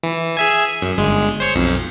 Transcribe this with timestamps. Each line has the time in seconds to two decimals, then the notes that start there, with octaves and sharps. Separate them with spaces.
0.03 E3
0.37 G#4 E5 G#5
0.82 F#2
0.97 G1 G#3
1.40 C5 C#5 C#6
1.55 B1 F2